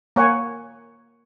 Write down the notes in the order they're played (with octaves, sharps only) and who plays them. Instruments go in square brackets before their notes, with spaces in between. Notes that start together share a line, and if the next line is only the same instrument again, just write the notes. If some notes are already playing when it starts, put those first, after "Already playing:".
[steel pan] A#3 C#5 F#5 G#5